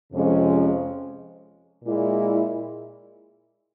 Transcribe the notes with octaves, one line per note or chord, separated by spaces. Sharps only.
F2 C3 F3 G#3 C#4
A#2 G#3 E4